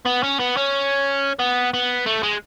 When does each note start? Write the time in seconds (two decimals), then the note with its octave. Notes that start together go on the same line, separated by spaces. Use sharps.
0.06 B3
0.23 C#4
0.39 B3
0.57 C#4
1.39 B3
1.74 B3
2.06 A3
2.23 G#3